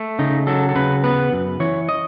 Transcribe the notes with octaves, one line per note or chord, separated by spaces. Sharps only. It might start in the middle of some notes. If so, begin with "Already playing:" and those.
Already playing: A3
C#3 D#4
F#3 A4
A4
C#3 B4
B3 B4
F#2
E3 C#5
D#5